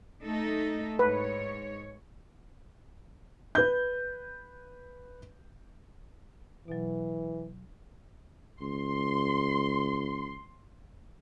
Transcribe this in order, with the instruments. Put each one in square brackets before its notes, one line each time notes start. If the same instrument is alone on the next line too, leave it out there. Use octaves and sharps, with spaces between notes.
[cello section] A3 D#4 A4
[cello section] G#2 C#5 [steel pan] B4
[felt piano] B4 G6
[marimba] B2 F#3 [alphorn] E3
[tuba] C#2 [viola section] C6